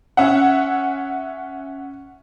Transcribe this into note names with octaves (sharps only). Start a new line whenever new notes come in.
C#4 E5 F#5